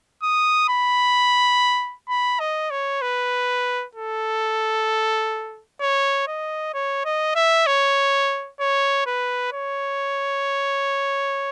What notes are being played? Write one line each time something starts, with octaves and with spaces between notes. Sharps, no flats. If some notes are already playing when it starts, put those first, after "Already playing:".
D#6
B5
B5
D#5
C#5
B4
A4
C#5
D#5
C#5
D#5
E5
C#5
C#5
B4
C#5